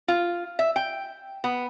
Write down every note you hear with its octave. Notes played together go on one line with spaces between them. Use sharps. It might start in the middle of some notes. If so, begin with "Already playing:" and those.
F4
E5
G5
B3